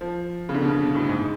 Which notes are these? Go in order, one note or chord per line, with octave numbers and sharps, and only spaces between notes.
F3
C#3
D3
B2
C#3
B2
A2
G#2